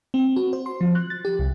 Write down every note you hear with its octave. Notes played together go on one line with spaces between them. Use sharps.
C4
F#4
C5
C6
F3
F#6
A6
G4
C2